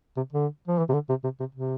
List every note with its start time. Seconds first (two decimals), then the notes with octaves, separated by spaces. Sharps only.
0.17 C3
0.33 D3
0.67 F3
0.78 E3
0.89 C3
0.93 D3
1.09 C3
1.24 C3
1.40 C3
1.55 C3